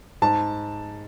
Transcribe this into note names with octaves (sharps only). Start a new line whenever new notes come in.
G#2 A5